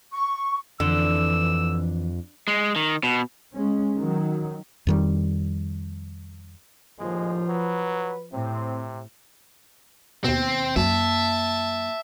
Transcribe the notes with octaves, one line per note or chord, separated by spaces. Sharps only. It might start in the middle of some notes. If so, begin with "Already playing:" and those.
C#6
F2 D3 E3 E6
G#3
D#3
B2
G#3 C#4
D#3 F#3
F2 D#3 G3
A#1 D#2 A2 F3 G#3
F#3 B4
A2 C3 C4
D#2 B2 C4
F#2 A#3 E5 A5